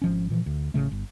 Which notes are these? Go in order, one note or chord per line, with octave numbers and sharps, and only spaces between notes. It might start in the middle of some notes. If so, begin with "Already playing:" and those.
G#1 F3 C#4
A#2 E3 F3
D2
A1 C#3 A3
G1